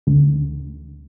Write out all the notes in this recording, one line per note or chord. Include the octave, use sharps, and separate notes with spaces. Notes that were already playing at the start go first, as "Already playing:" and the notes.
D2